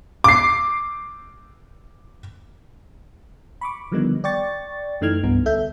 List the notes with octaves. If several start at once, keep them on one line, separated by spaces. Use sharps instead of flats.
D6 C7
B5 C#6 D6
D3 D#3 F3 G3 B3 D#4
D5 G5 C#6 A6
F#2 E3 A3 D#4 F6 G#6
C2 G2 B3
D2 A4 E5 G6